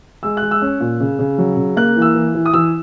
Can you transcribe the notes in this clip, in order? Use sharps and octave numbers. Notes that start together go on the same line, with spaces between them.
G#3 E6
G#3 F#6
E6
C#4
A#2
C#3
C#3
F#3
C#3
A#3 F#6
E3
E6
E3
E3
D#6
E3 E6